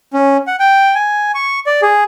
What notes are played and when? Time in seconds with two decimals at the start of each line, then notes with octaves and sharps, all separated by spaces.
0.13 C#4
0.47 F#5
0.59 G5
0.95 G#5
1.35 C#6
1.67 D5
1.82 G#4